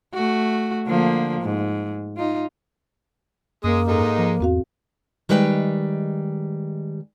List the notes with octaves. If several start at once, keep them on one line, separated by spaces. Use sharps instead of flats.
A3 F#4
D3 F3 A#3
G#2
D#4 F4
F#2 G#3 A#3 D#6
G#2 G#3 D#4 A4
F3
E2 C4 F#4 F5
D#3 G3 G#3 B4 D#5 G5